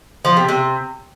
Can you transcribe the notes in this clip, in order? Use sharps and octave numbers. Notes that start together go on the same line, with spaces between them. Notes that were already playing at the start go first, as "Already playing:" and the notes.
F3
C3
C3